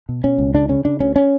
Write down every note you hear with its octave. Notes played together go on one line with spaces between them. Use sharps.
B2
B2 C#4
C#2
C#3 D4
C#3 C#4
C#3 D4
D2 C#4
C#4